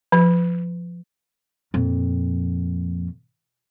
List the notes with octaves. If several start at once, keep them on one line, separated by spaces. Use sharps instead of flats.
F3
F2 A#2